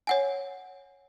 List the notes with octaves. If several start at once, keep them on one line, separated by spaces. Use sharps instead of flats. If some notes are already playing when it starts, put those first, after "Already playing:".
C#5 F#5 G#5